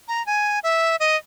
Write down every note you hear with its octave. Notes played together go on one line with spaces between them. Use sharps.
A#5
G#5
E5
D#5